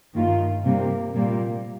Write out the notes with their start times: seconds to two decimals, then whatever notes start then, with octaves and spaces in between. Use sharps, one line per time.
0.14 G2 D#3 A#3 F4
0.65 C3 G3 A#3
1.14 A#2 G3 A#3